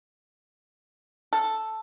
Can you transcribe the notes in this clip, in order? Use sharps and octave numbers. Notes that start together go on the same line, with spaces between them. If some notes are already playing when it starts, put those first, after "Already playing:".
A4